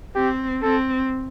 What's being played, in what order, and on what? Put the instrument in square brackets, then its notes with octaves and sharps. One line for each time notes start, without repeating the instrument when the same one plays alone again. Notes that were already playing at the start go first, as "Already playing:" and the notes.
[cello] C4 [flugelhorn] G4
[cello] C4 [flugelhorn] A4